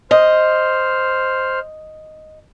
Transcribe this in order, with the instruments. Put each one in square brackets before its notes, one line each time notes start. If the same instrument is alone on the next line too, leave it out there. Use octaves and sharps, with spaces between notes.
[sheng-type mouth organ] C5 F6 [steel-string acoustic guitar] D#5